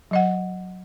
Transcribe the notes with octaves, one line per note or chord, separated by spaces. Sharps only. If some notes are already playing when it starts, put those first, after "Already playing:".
F#3 D#5 F#5